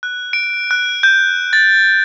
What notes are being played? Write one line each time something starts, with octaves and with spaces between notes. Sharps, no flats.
F#6
D7
F#6
G6
A6